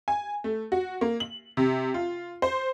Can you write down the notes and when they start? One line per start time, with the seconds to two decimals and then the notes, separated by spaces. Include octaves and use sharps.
0.08 G#5
0.44 A3
0.72 F#4
1.01 A#3
1.20 F#7
1.57 C3
1.94 F4
2.42 C5